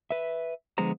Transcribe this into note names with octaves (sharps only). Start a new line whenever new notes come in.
B4 E5
D3 F3 G#3 B3 C5 A#5